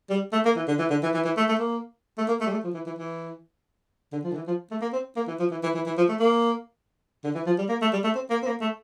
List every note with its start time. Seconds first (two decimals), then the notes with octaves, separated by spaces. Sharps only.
0.10 G3
0.32 A3
0.45 A#3
0.56 E3
0.68 D3
0.79 E3
0.90 D3
1.03 E3
1.14 E3
1.24 E3
1.37 A3
1.49 A3
1.59 A#3
2.18 A3
2.28 A#3
2.41 A3
2.47 G3
2.52 A3
2.64 F3
2.74 E3
2.86 E3
2.98 E3
4.12 D3
4.24 F3
4.31 D3
4.35 E3
4.47 F3
4.71 A3
4.81 A#3
4.93 C4
5.16 A#3
5.28 E3
5.39 F3
5.51 E3
5.63 E3
5.74 E3
5.86 E3
5.97 F3
6.09 A3
6.20 A#3
7.24 D3
7.34 E3
7.46 F3
7.58 G3
7.69 A#3
7.82 A3
7.93 G3
8.04 A3
8.15 C4
8.30 A#3
8.43 C4
8.47 A#3
8.61 A3